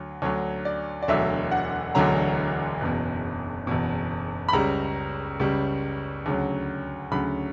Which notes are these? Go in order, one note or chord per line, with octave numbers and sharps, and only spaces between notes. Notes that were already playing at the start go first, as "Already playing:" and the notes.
Already playing: D2 F#3
D2 D3 F#3 C#5
D5
D5
E1 D2 D3 F#3 E5
F#5
E1 D2 D3 F#3 A#5
F#1 E2 B2
F#1 E2 B2
B5
C#2 C#3 G3 A#5
C#2 C#3 G3
D2 C#3 F#3
D2 C#3 F#3 B5